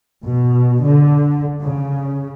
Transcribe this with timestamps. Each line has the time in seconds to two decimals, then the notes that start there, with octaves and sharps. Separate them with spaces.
0.25 B2
0.84 D3
1.61 C#3